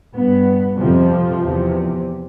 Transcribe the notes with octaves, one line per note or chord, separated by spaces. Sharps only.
G2 B3
F2 C3 F3
E2 C3